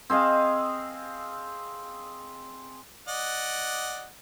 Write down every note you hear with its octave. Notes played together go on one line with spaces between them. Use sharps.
C4 G#4 D#5 F5
D5 D#5 F#5